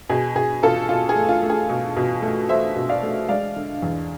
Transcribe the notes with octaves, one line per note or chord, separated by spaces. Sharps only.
B2 G#4
B2 G#4
B2 F4 A4
B2 F4
G#4
A3
F4
A3
G#4
B2
B2
A3
A3 C5 E5
B2
D5 F5
A3
G#3 D5 F5
D3
E2